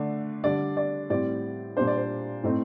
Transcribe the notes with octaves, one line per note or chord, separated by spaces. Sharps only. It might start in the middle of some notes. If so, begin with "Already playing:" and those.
Already playing: D3 A3 D4
D3 G3 D4 D5
D5
A2 G3 C4 D5
A#2 G3 D4 C5
D5
C5
A2 A3 C4 D#4